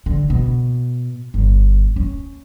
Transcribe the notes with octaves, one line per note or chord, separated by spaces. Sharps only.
D3
B2
G1
C#4